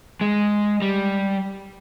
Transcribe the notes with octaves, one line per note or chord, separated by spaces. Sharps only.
G#3
G3